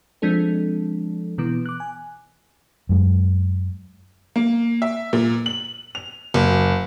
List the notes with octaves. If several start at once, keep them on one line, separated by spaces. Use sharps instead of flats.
F3 G#3 C4 D4 A4
B2 E3 B3
D6 F#6
G#5
F#2 G#3
A#3
E5
A#2
F#7
F7
F#1